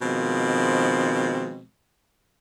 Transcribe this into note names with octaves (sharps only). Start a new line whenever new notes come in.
B2 D#3 F3 G#3 C4